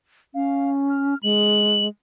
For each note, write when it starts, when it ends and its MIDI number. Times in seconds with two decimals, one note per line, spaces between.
0.34 1.15 61
0.34 0.70 77
0.90 1.18 89
1.23 1.88 56
1.23 1.85 102